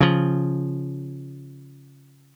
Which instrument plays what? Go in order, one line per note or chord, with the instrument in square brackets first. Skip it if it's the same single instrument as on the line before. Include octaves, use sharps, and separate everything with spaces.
[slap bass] C#3 F3